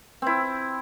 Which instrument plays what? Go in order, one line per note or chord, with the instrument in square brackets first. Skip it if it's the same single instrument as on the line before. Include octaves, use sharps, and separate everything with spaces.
[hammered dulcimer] C4 E4